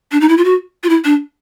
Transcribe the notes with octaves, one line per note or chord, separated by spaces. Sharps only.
D4
D#4
E4
F4
F#4
F4
E4
D4